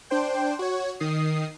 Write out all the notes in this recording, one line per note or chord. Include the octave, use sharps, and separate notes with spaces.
D4 C5 G5
F#4 C#5
D#3 D#6 C7